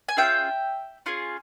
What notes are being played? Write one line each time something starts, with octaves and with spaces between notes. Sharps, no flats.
G#5
C#4 F4 G#4 E5 G5
C#4 F4 G#4